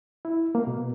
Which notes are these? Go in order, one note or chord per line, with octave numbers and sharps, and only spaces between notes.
E4
A#3
B2